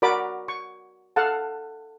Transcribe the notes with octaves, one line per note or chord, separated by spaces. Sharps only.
F#4 A#4 D5 B5 D6
C#6
A4 F5 F#5 A5